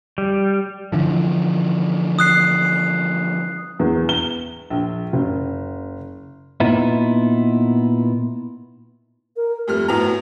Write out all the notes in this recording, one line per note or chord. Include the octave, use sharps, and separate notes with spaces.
G3
D3 E3 F3
D#6 F#6 C7
E2
G7
A#1
F#1
A#2 B3 D#4 E4
A#4
F2 G3 A3 F6
A2 B3 F#4 A#5